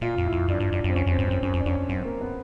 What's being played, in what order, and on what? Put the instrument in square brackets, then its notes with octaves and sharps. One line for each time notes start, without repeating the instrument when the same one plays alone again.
[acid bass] A#2 [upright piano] F4
[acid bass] F2
[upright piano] E4
[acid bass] F2
[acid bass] F#2 [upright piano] D4
[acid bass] G2
[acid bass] F#2 [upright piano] D4
[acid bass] F#2 [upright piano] C4
[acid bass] F2 [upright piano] C#4
[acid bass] F2 [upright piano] C4
[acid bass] G2
[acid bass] F#2 [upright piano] C4
[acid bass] F#2 [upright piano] C#4
[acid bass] F2
[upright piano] D4
[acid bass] F2 [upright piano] C#4
[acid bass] F#2 [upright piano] C4
[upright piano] A#3
B3